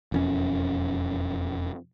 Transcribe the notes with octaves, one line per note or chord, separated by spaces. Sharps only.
E1 F2 C#4